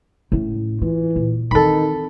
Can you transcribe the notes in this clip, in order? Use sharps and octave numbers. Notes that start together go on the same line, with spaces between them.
A2 C#4
E3 F4
A#2
D#3 E3 C4 A4 B5